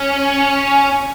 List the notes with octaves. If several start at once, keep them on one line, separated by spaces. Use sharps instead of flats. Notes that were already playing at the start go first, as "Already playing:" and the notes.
Already playing: C#4